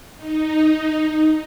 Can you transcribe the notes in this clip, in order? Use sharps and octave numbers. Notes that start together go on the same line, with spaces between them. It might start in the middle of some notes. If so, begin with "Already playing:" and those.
D#4